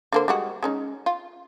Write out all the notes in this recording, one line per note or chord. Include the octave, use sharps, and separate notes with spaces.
D3 A#3 C5
G3 G#3 F#4
G#3 C#4 D#4
F4